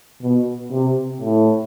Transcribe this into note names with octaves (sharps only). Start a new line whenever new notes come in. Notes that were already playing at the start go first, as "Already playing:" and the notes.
B2
C3
A2